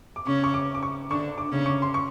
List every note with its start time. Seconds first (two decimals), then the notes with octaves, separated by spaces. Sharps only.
0.16 D6
0.26 C#3 C#4 C#6
0.44 C#6
0.54 D6
0.75 D6
0.83 C#6
1.10 D3 D4 C#6
1.38 D6
1.52 C#3 C#4
1.66 C#6
1.82 C6
1.94 C#6